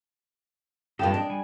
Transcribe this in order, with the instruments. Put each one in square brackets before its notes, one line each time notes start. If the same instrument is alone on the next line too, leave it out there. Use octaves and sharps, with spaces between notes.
[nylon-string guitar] G2 F3 G4 [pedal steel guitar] D#5 A5
[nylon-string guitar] D4
[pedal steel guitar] G3 G#5